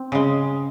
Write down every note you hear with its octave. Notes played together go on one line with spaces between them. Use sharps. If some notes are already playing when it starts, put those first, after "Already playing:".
Already playing: C4
C#3 G#3